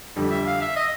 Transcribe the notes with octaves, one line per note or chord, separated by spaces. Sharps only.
F2 D3 G3
E5
F5
E5
D#5